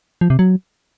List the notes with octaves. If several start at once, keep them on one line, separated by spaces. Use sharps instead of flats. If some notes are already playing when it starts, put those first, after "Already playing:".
F3
C3
F#3